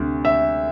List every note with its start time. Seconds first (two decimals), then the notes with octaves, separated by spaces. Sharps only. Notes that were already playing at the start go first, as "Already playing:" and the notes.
Already playing: D2 C3
0.25 E5